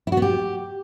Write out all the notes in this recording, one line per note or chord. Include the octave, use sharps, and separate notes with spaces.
E4
F#4
B3
G4